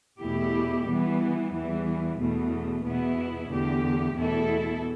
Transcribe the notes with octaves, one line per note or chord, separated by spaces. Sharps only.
E2 B2 A3 E4 G4
E3 G3 B3
E2 E3 G3
E2 B2 A3
E2 B2 B3 E4
E2 D3 A3 G4
E2 B2 A3 E4 A4